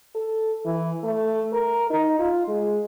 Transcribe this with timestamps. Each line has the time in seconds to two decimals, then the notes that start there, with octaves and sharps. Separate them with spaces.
0.15 A4
0.65 E3
1.04 A3
1.53 A#4
1.90 D#4
2.19 F4
2.48 G#3